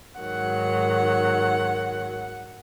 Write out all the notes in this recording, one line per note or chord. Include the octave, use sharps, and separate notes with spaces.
G#2 D#3 F#3 F#5